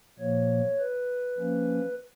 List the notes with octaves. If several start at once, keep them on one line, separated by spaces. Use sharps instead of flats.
A#2 F3 A#3 C#5
B4
F3 A#3 C#4